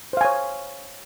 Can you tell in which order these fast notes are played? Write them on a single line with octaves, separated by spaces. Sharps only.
C5 F5 G#5 C#5